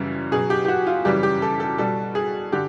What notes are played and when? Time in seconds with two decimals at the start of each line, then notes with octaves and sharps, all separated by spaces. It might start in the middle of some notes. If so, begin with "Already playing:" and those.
Already playing: F#2 C#3 E3 G3
0.32 B2 F#3 G#4
0.50 G4
0.65 G4
0.68 F#4
0.87 F4
1.05 F#2 C#3 E3 G3 G4
1.23 G4
1.42 A4
1.60 A4
1.78 B2 G3 A4
2.15 G#4
2.52 D3 G4